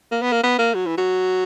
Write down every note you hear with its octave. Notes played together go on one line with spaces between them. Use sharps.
A#3
B3
A#3
B3
A#3
F#3
E3
F#3